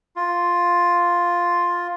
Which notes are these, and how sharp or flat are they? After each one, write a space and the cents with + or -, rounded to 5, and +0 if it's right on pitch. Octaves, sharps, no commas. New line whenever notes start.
F4 +5